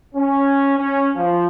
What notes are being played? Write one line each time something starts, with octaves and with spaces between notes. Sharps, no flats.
C#4
C#4
F3